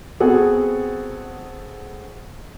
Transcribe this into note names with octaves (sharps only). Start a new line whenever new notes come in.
B3 C4 F#4 G#4 A4